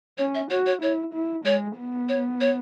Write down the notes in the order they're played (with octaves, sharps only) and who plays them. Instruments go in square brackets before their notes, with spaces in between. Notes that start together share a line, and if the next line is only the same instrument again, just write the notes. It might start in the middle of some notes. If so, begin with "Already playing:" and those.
[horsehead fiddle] C#4 [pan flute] C#5
[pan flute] E5
[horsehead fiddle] F#4 [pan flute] C#5
[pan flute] C#5
[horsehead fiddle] E4 [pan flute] C#5
[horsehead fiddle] E4
[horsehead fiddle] G#3 [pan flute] C#5
[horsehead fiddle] B3
[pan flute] C#5
C#5